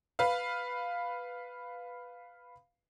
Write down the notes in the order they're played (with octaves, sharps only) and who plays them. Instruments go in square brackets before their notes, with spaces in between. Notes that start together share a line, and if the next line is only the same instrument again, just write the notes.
[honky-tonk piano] B4 F5